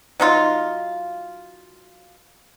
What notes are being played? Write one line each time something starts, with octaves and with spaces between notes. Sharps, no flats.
F#3 D#4 F4